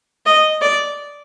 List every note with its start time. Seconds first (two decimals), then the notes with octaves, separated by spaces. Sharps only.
0.26 D#5
0.61 D5